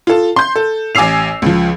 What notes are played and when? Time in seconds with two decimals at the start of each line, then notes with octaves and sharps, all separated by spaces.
0.07 F4 A4
0.36 C6 G6
0.56 A4
0.95 A1 G#5 D6 E6 C7 F7
1.42 C#2 F3